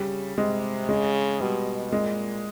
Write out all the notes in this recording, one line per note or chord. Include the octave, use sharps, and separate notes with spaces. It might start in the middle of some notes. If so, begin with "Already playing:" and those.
Already playing: C#3 G3
C3 G#3
C#3 G#3
B2 G3
A#2 G#3